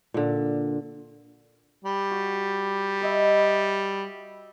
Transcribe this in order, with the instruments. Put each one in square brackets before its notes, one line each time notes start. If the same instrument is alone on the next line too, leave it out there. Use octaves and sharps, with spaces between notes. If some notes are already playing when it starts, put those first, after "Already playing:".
[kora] A#2 D3
[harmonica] G3
[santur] F#4
B4 D#5 E5